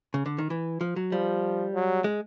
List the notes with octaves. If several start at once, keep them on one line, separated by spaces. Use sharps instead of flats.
C#3
D3
D#3
E3
F3
F#3
F3 G3
F#3
G#3